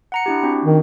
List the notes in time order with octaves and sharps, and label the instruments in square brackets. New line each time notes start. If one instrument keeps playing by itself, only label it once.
[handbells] F#5 A#5 C#7
D4 E4 G4
C4 D4 F#4
[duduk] D#3